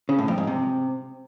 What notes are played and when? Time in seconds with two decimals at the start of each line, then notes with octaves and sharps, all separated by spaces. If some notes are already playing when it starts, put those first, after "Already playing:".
0.09 C#3
0.18 A2
0.28 F2
0.38 G#2
0.47 C3